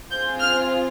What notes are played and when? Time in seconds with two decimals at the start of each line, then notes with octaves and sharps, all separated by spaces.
0.10 C4 F4 G#4 G6
0.40 F6